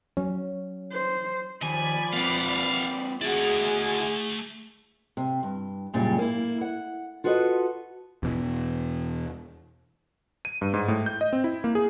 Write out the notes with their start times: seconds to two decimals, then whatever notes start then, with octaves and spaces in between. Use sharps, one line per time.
0.17 F#3 C#4
0.92 C5
1.62 D#2 F3 D5 G#5 B5
2.13 A#3 C4 F5 F#5
3.21 A3 E4 F#4 G#4 D5 G#5
5.17 C3
5.43 G2
5.94 F#2 A#2 C#3 G3
6.18 A#3 E4
6.61 F#5
7.24 F4 F#4 A4 B4 D#5
8.23 E2 B2 E3
10.45 D#7
10.61 G2
10.74 G#2
10.88 A2
11.06 G6
11.21 D#5
11.33 C4
11.44 E4
11.64 A#3
11.75 G#4